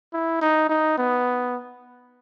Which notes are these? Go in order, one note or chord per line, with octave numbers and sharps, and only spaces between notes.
E4
D#4
D#4
B3